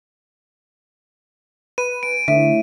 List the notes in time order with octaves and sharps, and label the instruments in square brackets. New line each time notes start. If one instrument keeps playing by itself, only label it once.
[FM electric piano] B4 [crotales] D#7
[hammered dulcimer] G#5 [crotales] D7
[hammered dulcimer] A2 [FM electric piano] D3 [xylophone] E5